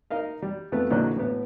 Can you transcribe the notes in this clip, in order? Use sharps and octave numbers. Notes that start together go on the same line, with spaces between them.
D#4 A#4 D#5 F5
G3
F2 A3 B3 B4
A#1 D3 E3 F#3 D#5 F#6
A2 B3